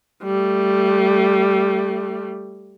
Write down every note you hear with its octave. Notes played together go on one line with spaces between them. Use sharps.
G3 A3